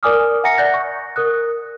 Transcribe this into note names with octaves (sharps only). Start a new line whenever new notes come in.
A#4 D5 G#5 D6 D#6 F6
E5 F#5 G#5 A#5 A#6 C#7
D5 F#5 F#6 G6 A6 A#6
C#6
A#4 D#6 F#6